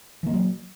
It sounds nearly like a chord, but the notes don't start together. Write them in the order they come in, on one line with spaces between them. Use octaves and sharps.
E3 A#3 G#3 F#3